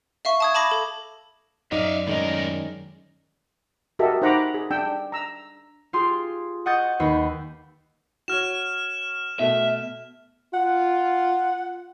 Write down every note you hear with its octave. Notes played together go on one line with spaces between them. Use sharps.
E5 F5 C#6
A5 D#6 G#6
A5 B5 D6 A#6
A4
F#2 D#4 D5 E5 F5
A2 D#3 G#3 C#4 A#4
F#4 G4 A4 A#4 D#5 E5
D#4 C5 F#5 A#5 B5 D6
G#4
D4 G5 E6
A#5 E6
F4 G4 G#4 C6
D#5 F#5 C#6 D#6 G6 A6
D#2 B4 D#5 B5 C#6 C7
F#4 C#5 F6 E7
B2 A3 E5
F4 F#5